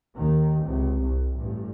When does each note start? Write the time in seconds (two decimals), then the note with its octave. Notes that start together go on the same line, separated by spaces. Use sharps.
0.16 D#2 D#3
0.66 C#2 C3
1.02 C2
1.37 A1 G2